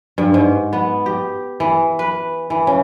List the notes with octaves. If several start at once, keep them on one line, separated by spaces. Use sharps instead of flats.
G2
G#2
B3
G4
E3
B4
E3
C#3